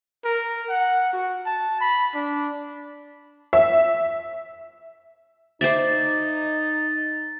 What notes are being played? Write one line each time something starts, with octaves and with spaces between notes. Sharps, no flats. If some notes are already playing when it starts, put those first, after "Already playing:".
A#4
F#5
F#4
A5
B5
D4
E5
D#4 C5 D5 E5 A6